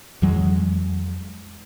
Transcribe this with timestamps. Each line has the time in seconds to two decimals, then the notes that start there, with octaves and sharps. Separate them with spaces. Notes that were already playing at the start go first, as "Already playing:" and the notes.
0.22 F2 E3 F#3 G#3